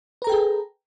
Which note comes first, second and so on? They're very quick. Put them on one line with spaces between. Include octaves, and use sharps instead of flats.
B4 A#5 A4 G5 G#4